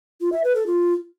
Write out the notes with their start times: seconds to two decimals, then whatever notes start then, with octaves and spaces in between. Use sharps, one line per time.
0.21 F4
0.32 E5
0.44 B4
0.55 A4
0.67 F4